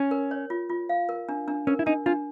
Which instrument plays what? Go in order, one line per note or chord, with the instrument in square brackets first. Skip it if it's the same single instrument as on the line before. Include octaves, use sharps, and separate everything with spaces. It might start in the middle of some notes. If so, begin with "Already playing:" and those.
Already playing: [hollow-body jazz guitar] C#4
[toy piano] A#4
C#5
F4
F4
F5
A#4
D4
D4
[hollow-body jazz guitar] C#4 [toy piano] A#4
[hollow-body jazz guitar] E4
[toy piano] D4 [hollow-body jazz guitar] D#4
[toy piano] D4 [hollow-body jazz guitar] F4